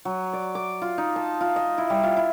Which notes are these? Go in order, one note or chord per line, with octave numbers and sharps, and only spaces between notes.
F#3
D5
D6
F4
D#4
A5
F4
D#5
E4
G3
F4
E4